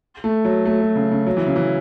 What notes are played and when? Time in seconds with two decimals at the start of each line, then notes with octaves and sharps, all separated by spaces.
0.24 A3
0.45 F#3
0.65 A3
0.80 F#3
0.96 C#3
1.12 C#3
1.27 F#3
1.37 E3
1.46 C#3
1.56 E3